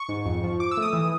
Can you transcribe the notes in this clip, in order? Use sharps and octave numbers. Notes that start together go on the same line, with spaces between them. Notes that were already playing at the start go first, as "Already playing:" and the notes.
Already playing: C#6
G#2
F2
F3
F3 D6
E6
A3 D#6
E3